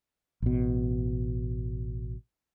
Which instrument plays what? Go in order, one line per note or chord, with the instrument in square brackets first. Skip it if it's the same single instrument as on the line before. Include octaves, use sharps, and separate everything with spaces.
[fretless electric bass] A1 B2